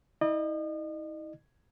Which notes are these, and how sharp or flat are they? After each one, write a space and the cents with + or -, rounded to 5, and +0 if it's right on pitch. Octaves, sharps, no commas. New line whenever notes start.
E4 -45 D#5 -40